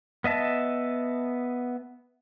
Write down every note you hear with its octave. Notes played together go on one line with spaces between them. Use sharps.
B3 D#5 E5 A5